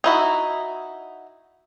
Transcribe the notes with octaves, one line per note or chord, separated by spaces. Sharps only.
D#4 E4 F#4